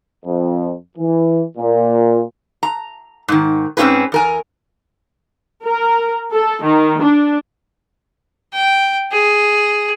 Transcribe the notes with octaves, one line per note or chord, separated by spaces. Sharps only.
F2
E3
A#2
A#5
G#2 D#3
G#2 C4 C#4 F4 G#4 B4
E2 A#4 G#5
A#4
A4
D#3
D4
G5
G#4